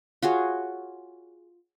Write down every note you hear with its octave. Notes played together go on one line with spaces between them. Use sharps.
F4 F#4 G#4 C#5